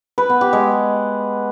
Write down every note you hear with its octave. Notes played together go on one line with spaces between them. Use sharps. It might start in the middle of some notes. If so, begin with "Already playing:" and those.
B4
B3
G4
G#3